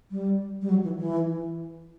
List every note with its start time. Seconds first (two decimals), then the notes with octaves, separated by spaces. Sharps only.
0.11 G3
0.62 G3
0.69 F#3
0.84 E3
0.98 E3